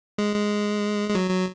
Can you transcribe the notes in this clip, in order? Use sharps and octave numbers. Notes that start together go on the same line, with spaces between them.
G#3
G#3
G#3
F#3
F#3